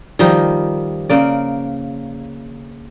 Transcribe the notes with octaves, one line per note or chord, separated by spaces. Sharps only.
D#3 F3 G3 D#4
C#3 A#3 D5